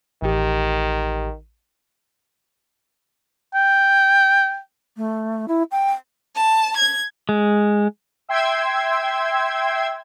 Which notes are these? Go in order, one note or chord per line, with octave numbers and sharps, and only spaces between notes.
A1 D#3 G4
G5
A3
E4
G5
A5
G#6
G#3
E5 G5 C6 E6 G#6